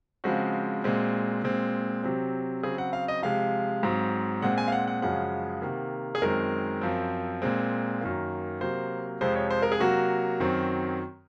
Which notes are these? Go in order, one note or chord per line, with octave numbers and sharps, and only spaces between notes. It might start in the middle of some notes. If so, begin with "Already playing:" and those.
C#3 F3 G#3 C4 F#4
A#2 G#3 C4
A#2 G#3 C4
C3 F#3 C4
C#3 F#3 C4 G#4
F#5
F5
D#5
C3 F3 G#3 F5
G#2 F#3 C4
A#2 G#3 C4 F#5
G#5
F5
F#5
F#5
F#2 C#3 F3 G#3 F#5
C3 D#3 A#3
G#4
F#2 D#3 G#3 C4 A#4
F#2 F3 C4
A#2 G#3 C4
F#2 D#3 A#3
C3 F#3 A#3 C5
F2 C3 F3 G#3 C4 C5
C#5
C5
A#4
G#4
C3 F#3 A#3 F#4
F#2 D#3 F#3 C4